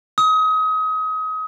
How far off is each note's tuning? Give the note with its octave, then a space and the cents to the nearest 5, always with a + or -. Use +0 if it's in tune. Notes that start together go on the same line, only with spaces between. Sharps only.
D#6 +30